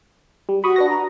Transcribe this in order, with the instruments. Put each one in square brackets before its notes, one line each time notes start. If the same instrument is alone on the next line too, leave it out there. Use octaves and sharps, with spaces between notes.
[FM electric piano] G3
[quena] F#4 [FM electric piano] B5 C#6 D#6
[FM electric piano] D4 B4 A#6
[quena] A#5